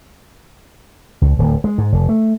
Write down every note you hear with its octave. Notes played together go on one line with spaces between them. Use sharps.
C#2
D1
G#3
G#2
F1
A3